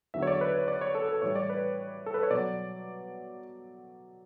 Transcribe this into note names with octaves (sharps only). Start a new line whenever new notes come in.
E2 D3 F#3 E5
C#5
D5
B4
C#5
D5
C#5
A4
A4
A2 E3 G3 C#5
D5
B4
A4
B4
C#5
B2 F#3 D5